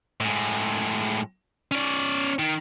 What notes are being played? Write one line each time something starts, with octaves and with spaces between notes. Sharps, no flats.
A2 G#3
C#4 D5
D#3